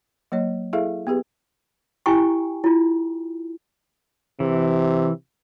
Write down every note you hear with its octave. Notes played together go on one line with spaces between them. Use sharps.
F#3 A#3 C#5 D#5
E4 G#4 A4 E5 F5
B3 G4 G#4 B4
E4 G4 G5 G#5 A#5 C#6
E4 F4
C3 E3